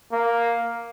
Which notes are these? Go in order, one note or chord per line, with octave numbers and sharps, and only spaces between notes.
A#3